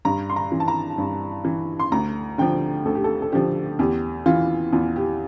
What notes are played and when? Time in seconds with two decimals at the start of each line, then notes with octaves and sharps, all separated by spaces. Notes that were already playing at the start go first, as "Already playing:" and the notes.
0.05 G2 A#5
0.30 C6
0.36 A#5
0.52 E3
0.60 A5
0.68 A#5
0.98 G2
1.45 E3
1.79 C6
1.92 D2 A#5
2.38 D3 F3 G5
2.85 D2 A4
2.95 G4
3.04 A4
3.22 A4
3.32 D3 F3 G4
3.79 E2 G4
4.26 E3 F4
4.72 E2 F4
4.96 G4